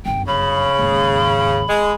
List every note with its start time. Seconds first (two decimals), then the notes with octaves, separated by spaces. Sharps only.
0.06 G1 F#2 G5
0.27 C#3 B5
0.79 D#2 G#2
1.68 G#3